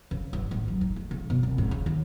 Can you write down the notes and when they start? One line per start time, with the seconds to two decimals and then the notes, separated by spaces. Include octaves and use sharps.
0.11 C#3
0.33 G2
0.51 A1
0.68 F#3
0.81 D#4
0.96 A3
1.11 C#3
1.30 B2
1.43 C2
1.58 G#2
1.71 C#3
1.86 D#2